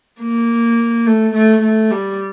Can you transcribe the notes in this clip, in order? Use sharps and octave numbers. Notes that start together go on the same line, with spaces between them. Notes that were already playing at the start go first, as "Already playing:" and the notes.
A#3
A3
A3
A3
G3